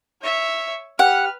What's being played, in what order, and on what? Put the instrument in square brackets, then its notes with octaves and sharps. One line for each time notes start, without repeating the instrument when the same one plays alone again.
[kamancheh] C#5 E5
[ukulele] G4 [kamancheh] B4 F6 [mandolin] F#5